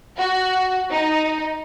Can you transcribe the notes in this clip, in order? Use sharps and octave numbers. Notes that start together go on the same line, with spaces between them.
F#4
D#4